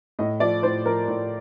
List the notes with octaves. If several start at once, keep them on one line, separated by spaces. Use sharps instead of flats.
A2 D#5
F3 D5
A2 C5
F3 A#4
A2